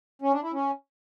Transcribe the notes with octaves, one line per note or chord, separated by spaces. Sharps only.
C#4
D4
E4
C#4